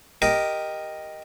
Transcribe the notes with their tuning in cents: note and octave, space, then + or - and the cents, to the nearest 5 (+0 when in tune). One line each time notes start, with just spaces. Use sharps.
G4 +0 A#4 +0 D#5 +0